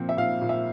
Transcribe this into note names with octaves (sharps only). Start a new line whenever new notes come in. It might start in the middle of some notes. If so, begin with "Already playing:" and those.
Already playing: A#2 F3 C4
E5
A#2 F5
A#2
E5